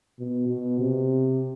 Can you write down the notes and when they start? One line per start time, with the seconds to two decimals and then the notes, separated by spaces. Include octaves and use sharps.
0.19 B2
0.48 B2
0.79 C3